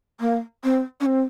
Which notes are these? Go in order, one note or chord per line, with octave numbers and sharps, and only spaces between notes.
A#3
C4
C#4
C4